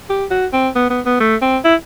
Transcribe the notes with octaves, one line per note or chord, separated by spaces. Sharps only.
G4
F#4
C4
B3
B3
B3
A3
C4
E4